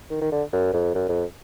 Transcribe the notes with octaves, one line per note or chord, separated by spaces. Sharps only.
D#3
D#3
D3
F#2
F2
F#2
F2